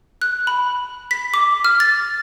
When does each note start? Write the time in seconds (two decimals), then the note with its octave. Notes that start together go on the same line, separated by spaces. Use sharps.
0.22 F#6
0.47 B5
1.11 B6
1.34 D6
1.65 F6
1.80 A6